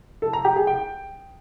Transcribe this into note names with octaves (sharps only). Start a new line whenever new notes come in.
A4
A#5
G4
G#4
G5